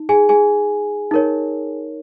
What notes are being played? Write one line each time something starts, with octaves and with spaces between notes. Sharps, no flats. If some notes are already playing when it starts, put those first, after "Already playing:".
Already playing: D#4
G#4 G#5
G#4 G#5
D#4 A#4 C#5